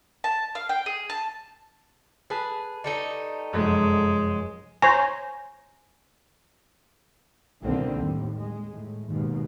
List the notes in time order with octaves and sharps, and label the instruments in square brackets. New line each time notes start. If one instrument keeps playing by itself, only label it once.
[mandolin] A5
F5
G5
G#4
A5
[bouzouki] G#4 [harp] B4 A5 F#6
[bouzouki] G3 A3 D#4
[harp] F1 F#2 [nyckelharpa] G#3
[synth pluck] C5 C#5 A#5 [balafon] G#5
[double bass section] C2 B2 D3 D#3 A#3 C4
D#2 A2 G3
G#3
A2
D#2 G#2 B2